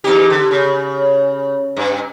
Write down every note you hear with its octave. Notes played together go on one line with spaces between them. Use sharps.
E2 D#4 G4
D3
C#3
G2